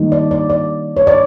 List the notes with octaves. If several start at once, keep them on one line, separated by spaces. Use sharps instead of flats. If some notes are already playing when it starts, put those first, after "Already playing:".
Already playing: D#3 G3 A#3 D#4
D5
D5
D5
C#5
D5